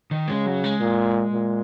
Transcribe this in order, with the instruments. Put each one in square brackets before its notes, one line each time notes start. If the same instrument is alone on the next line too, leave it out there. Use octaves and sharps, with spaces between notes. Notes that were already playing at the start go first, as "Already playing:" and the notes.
[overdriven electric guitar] D#3
[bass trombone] C#3 [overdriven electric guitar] G#3
[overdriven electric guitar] F#3
G#3
[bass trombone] A#2
A#2